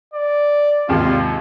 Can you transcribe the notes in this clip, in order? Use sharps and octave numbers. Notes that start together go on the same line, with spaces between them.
D5
G#1 D#2 C3 F4